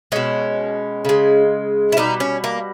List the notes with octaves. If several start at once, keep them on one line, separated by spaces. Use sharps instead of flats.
B2 G#3 C#4
C#3 G#3
E4
B2 G3 D#4
C#4
A#3